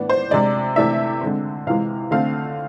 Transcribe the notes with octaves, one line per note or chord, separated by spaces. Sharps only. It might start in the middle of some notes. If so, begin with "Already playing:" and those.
Already playing: A2 E3 B3 D4
C5
C3 G#3 D4 D5
C3 E3 A3 D4 E5
D3 G#3 C4
C3 E3 G#3 F5
D3 A3 C4 F5